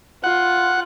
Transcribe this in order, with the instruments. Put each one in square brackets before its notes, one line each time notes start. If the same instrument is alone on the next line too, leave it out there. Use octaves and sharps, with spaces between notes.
[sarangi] F4 [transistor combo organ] F#5